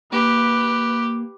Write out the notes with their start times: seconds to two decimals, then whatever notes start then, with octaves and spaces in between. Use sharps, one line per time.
0.12 A#3 G4 B4